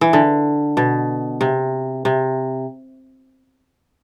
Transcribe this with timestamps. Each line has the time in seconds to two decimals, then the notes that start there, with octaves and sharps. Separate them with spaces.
0.01 E3
0.13 D3
0.77 B2
1.41 C3
2.05 C3